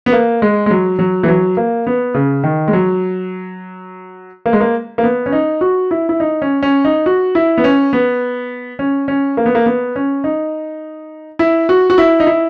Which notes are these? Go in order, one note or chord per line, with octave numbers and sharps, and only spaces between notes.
B3
A#3
G#3
G#3
F#3
F#3
E3
F#3
A#3
B3
C#3
D#3
G#3
F#3
A#3
G#3
A#3
A#3
B3
C#4
D#4
F#4
E4
E4
D#4
C#4
C#4
D#4
F#4
E4
B3
C#4
B3
C#4
C#4
A#3
B3
A#3
B3
C#4
D#4
E4
F#4
F#4
E4
D#4
E4